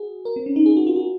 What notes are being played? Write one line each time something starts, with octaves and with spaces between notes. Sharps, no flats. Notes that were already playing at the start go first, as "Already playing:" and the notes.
Already playing: F#4 G#4
A#4
C4
C#4
D#4
G#4
F#4
F4
F#4